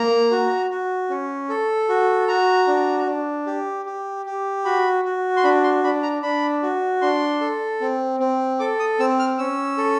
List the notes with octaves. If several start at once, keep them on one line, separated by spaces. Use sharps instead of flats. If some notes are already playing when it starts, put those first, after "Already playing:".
Already playing: A#3 A#5
F#4
F#4
C#4
A4
F#4
F#4 A#5
D4
D4
G4
G4
G4
F#4 B5
F#4
C6
D4 B5
C6
D4 B5
A#5
D4 B5
F#4
D4 C6
A4
C4
C4
A4 D6
D#6
C4 E6
F6
C#4 E6
A4